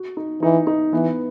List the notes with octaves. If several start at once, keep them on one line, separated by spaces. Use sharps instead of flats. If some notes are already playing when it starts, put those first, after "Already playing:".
Already playing: F#4
D#4
E3 D#4
D#4
E3 B3